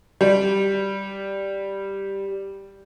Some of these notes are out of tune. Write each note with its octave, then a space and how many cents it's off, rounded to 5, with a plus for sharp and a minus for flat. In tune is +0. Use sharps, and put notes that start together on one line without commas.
G3 +0